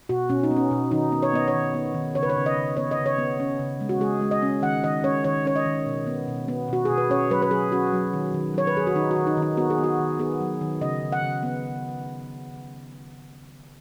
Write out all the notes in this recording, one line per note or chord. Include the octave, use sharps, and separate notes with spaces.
B2 F#4
B2 C#4
D#4
B3
C#4
B2
D#3 D#4
B3
C#5
B3 D#5
C#5
D#3
B3
D#3
C#3 C#5
B4
C#5
C#3
D#5
C#3
B3 C#5
D#5
C#3
C#5
B3
C#4
C#3
G#3
F#4
G#3 G#4
G#3
D#5
C#4
D#3 F#5
D#3 D#5
C#4 C#5
D#3 C#5
C#4 C#5
D#5
D#3
B2
B3
B2
B3
B2 F#4
B2 G#4
B4
C#4 C#5
F#3 B4
B4
F#3 G#4
C#4 F#4
F#3
D#3
D#3
F#3 C#5
B4
F#3 G#4
F#4
D#3 D#4
F#4
D#3
D#4
D#3
D#4
B3 F#4
G#4
B3
F#4
D#3
B3 G#4
F#3
D#3
C#3 D#5
C#3
F#5
C#3
B3